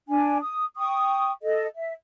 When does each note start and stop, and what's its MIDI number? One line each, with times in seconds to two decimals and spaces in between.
0.09 0.38 62
0.09 0.38 80
0.41 0.64 87
0.78 1.31 79
0.78 1.31 85
0.78 1.31 87
1.42 1.66 69
1.42 1.66 75
1.77 1.93 76